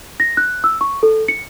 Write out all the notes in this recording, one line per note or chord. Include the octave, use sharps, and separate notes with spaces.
A#6
F#6
E6
C#6
A4
C#7